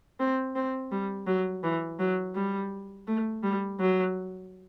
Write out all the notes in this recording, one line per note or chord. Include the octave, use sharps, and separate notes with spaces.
C4
C4
G3
F#3
E3
F#3
G3
A3
G3
F#3